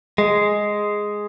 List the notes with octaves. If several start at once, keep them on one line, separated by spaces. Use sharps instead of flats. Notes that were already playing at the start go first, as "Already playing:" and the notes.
G#3